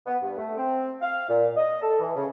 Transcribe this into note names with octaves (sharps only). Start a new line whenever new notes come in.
B3
G2
A3
C4
F5
A#2
D#5
A4
E3
C#3